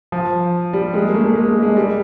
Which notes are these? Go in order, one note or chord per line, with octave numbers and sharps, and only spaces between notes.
F3
G3
G#3
A#3
A3
A3
G#3
G#3
G#3
G3